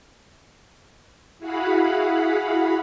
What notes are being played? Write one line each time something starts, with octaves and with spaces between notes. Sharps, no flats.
E4 F#4 G#4 F5 F#5 B5